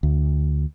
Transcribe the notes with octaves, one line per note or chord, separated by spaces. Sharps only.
D2